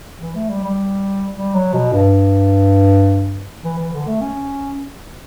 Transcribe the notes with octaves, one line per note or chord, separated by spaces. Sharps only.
E3
A3
G3
G3
G3
F#3
B2
G2
E3
E3
D3
A3
C#4